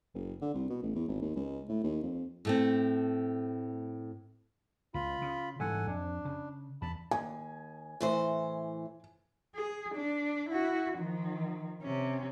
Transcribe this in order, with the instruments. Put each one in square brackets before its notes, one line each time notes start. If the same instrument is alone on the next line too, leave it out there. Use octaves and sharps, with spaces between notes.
[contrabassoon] F#1
D3
C2
B2
A1
E2
G#1
D#2
C#2
A2
D#2
F2
[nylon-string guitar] A2 A3 C4
[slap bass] C#2 [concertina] F4 B5
[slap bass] C#3
[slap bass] G#2 E3 G3 [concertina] A4 F#5 G#5
[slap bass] F2 [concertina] D4
[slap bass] C#3
[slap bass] E2 [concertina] A5 B5
[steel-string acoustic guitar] D#2 [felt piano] G#5
[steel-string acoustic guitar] A2 E3 C5
[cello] G#4
D4
E4 F#4
D#3 F3
C3 C#4